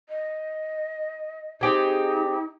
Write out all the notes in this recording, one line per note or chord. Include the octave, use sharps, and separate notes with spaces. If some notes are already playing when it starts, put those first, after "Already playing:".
D#5
C4 D#4 G4 G#4